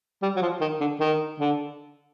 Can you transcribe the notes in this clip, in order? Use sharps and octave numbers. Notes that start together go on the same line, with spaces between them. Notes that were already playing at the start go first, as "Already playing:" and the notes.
G3
F#3
F3
D#3
D3
D#3
D3